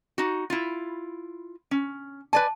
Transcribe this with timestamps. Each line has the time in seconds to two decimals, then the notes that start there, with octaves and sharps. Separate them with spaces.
0.18 D#4 F#4
0.50 E4 F4
1.71 C#4
2.33 B4 D5 G#5 A5